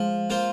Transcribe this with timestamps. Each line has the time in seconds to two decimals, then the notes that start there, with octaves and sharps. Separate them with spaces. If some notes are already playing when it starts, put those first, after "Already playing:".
Already playing: F3 G#3
0.30 A#3 F4 C5